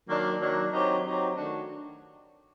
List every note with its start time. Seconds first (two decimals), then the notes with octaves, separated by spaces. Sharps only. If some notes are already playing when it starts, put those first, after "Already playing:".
0.08 D#3 F#3 A#3 D4
0.40 D#3 F#3 A#3 D4
0.72 F#3 C4 D#4 G4
1.04 F#3 C4 D#4 G4
1.35 D#3 A3 D4 F#4